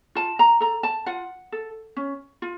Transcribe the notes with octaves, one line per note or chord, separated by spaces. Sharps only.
F4 A5
A#5
A4 A#5
A5
F4 F#5
A4
C#4
F4